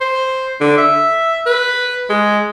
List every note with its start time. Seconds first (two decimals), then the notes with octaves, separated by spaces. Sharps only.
0.01 C5
0.61 D3
0.78 E5
1.46 B4
2.10 G#3